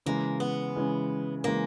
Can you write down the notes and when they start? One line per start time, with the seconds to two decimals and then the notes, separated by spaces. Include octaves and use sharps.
0.06 C#3 E3 G#3 A#3
0.40 B3
0.76 C#3 E3 G#3
1.44 C#3 E3 G#3 A#3